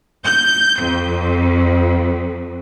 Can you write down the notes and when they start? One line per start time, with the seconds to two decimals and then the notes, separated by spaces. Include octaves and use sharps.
0.24 G6
0.81 F2